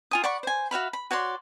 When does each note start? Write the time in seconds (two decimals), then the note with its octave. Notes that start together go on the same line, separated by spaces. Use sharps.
0.11 F4 G#5 D#6
0.24 D5 F#5 B5 C#6
0.43 C5 G#5
0.71 F#4 E5 F5 B5
0.93 B5
1.11 F#4 C#5 D5 C6